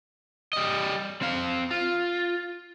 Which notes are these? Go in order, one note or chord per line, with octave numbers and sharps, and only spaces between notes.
G3 D#5
C4 F5
F4